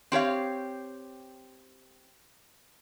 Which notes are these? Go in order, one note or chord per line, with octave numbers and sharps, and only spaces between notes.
C4 G4 C#5 F5